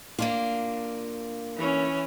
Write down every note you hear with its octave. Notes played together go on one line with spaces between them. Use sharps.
A#3 D4 F4
E3 C#4